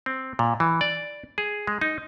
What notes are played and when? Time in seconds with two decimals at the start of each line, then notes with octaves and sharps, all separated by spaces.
0.06 C4
0.39 A#2
0.60 E3
0.81 D5
1.38 G#4
1.67 G#3
1.81 D#4